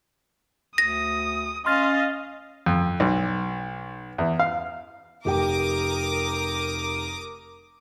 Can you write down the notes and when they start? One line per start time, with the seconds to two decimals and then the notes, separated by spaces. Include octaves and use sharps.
0.78 D2 D#6 A#6
1.66 C#4 D#5 F5 C6 F6 A6
2.66 F2
3.00 B1
4.18 E2
4.39 F5
5.25 F1 G4 A#4 G5 D6 D#6